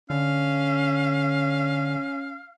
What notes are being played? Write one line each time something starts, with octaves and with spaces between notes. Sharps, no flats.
D3 C#4 F5